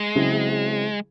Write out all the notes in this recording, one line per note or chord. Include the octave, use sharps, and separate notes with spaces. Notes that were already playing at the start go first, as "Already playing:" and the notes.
Already playing: G#3
C#3 F#3 C4 E4 G#4